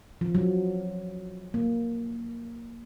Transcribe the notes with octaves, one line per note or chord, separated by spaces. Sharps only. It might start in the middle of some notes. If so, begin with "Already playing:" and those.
F3
F#3
A#3